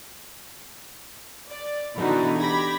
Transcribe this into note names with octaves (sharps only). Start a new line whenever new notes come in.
D5
B2 D3 E3 D#4 E4 F#4
G4 B5 G#6 A#6